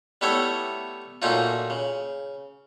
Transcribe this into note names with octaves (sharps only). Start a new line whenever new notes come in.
G3 A3 B3 E4 A4 C#5
A#2 F#3 A3 C#4 D#4 F4
C#3